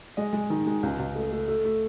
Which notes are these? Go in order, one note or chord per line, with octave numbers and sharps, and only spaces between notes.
G#3 D#5
G#3
D#3
G#3
C#2
C#2
A3
A3
A3
A3